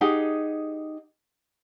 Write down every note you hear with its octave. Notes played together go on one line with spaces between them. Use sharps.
D#4 G4 G#4 F#5